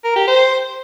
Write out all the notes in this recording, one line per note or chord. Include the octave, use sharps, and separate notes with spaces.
A#4
G4
C5